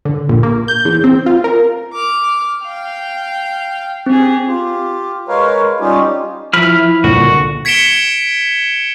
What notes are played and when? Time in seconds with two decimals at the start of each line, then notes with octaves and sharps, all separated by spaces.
0.05 D3
0.29 A#1
0.43 A#3
0.68 G6
0.85 E2
1.04 C4
1.26 F4
1.44 A#4
1.93 D6 F6
2.64 F5 G5
4.06 C4 G4 G#4
4.47 F4 G4
5.28 G#3 A#4 B4 C#5 F5
5.80 G3 C#4 D#4 F4 G4
6.53 F3 E4 B5 F6
7.04 C2 A#2 D3 F#4
7.65 G#6 B6 C#7 D7 E7 G7